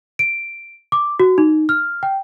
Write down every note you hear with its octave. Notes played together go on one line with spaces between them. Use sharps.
D7
D6
F#4
D#4
F6
G5